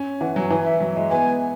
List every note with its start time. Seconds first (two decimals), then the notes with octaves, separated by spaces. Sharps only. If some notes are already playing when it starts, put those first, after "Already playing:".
Already playing: C#4
0.21 E3 F#5
0.36 F#3 G#5
0.50 E3 G#5
0.65 E5
0.80 F#3
0.96 G#3
1.10 B3 G#5